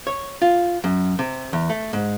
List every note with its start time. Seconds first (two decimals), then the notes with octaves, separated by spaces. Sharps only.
0.07 C#5
0.42 F4
0.84 F#2
1.19 C3
1.53 E2
1.70 A3
1.93 G#2